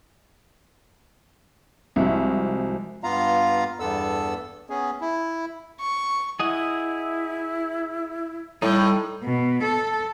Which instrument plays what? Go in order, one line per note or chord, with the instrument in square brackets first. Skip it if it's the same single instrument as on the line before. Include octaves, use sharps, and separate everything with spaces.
[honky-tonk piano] C2 [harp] F3 G#3 F#4
[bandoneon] G2 B3 F4 F5 A#5
E2 G2 B3 A4 E6
B3 C#4 G#4
E4
[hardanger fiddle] C#6
[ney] E4 [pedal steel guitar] G#4 D#5 F#5
[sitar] A2 [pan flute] G3 [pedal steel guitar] D#4 G5
[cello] B2
A4